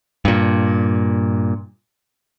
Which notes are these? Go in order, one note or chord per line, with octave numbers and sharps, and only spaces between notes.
G2 A#2